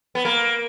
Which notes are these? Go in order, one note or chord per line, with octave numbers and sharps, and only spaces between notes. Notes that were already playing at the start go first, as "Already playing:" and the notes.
B3
A#3